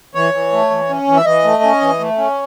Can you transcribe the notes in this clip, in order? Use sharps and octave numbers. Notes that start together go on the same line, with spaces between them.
E3 C#5
E3
A3
E3
C#4
E3
E5
E3 D#5
A3
C#4
E3
A3
C#4